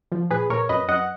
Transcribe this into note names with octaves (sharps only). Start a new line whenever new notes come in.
F3
A#2 G#4 B4
A#2 A#4 C#5
F#2 B4 D#5
F#2 D#5 F#5